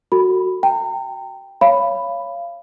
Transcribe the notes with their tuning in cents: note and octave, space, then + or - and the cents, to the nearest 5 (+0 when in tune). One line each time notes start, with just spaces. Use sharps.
F#4 +0 A4 +30 B5 +0
G5 +0 A#5 -35
C#5 +0 F5 -25 B5 +5